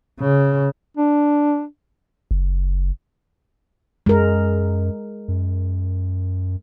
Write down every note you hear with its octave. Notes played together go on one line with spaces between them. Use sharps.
C#3
D4
F#1
F#2 G#3 A#4
F#2